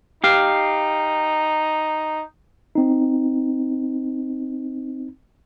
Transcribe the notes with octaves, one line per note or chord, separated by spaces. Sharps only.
D#4 G4 F5
C4 D#4